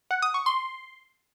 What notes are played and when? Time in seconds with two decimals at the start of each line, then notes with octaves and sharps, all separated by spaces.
0.11 F#5
0.22 D#6
0.34 C#6
0.46 C6